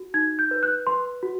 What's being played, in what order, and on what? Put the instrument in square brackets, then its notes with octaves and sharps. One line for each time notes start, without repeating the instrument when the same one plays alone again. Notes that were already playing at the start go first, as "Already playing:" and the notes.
Already playing: [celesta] F#4
D#4 G#6
G6
B4
F#6
B4 C6
F#4